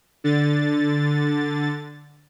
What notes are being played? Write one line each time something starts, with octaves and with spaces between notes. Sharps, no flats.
D3 A6